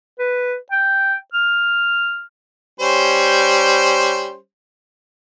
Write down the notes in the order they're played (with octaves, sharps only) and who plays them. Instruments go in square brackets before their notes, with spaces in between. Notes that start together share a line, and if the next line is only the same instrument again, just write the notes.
[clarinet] B4
G5
F6
[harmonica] G3 C#4 C5